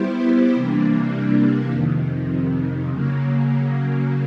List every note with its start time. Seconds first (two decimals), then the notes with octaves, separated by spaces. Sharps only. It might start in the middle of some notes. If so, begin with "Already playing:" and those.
Already playing: G3 B3 E4 G4 C5
0.55 C3 E3 G3 A#3 D4
1.71 F2 C3 D#3
2.88 C#3 F#3 A#3